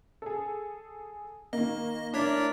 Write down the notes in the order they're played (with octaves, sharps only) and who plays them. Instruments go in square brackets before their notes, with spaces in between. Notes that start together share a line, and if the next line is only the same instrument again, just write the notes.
[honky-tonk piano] G#4 A4
[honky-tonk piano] D#3 A#3 [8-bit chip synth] D#5
[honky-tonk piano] A2 [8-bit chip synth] D4 C#5 B6 [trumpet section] A#4 D5